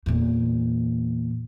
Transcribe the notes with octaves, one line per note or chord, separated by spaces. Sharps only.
E2 A#2